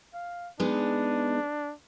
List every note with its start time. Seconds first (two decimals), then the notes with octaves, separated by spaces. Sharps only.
0.14 F5
0.60 G#3 B3 D4 D#4